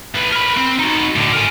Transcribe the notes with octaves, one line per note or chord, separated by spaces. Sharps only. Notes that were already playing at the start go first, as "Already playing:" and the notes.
A3 B4
A#4 B5
C4
D#4 F#4
A2 D3
A#4 G#5